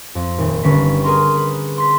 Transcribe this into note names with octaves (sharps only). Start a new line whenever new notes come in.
F2
D#1
G1 D3 G3 C#4 B6
G#4 A#4 A#5 C6
B4
C6 B6